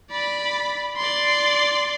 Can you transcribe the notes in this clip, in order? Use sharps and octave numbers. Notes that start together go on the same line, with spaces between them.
D5 B5
D5 C6